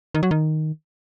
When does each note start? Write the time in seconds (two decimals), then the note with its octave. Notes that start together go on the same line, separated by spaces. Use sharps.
0.14 D#3
0.23 F#3
0.31 D#3